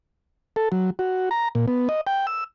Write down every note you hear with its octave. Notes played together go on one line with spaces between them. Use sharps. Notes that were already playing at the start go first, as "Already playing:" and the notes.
A4
F#3
F#4
A#5
A#2
B3
D#5
G5
E6